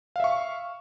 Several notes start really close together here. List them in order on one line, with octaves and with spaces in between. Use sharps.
F5 E5 C#6